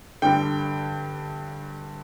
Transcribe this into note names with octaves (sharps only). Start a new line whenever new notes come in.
G2 D3 G5